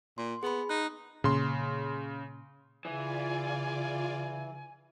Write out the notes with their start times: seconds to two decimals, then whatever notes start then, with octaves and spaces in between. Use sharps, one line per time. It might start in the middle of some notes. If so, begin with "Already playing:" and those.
0.18 A#2 C6
0.43 B3 G#4 B5
0.69 D#4 F#6
1.24 A#2 C#3 A#3 C6
2.85 C#3 E3 F4 D5 G#5